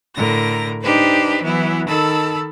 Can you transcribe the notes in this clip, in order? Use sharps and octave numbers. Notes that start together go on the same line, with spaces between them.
A2 D3 A#4 A#6
D4 D#4 G4 B4 C5
E3 F#3 B3 E4
D#3 A4 A5 B5 E6